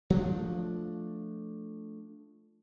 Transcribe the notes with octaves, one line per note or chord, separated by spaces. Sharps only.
F3 A3 D4